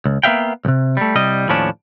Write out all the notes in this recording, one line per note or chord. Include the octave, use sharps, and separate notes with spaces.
C#2
A#3 B3 A4 E5 F5 G5
C2 C3
G3 A3
C2 G3 D#5
D#2 A2 F3 C#4 D4